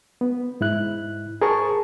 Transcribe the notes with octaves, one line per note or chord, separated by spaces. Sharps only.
B3
G#2 E4 F#6
G#4 A#4 C5 A5 C#6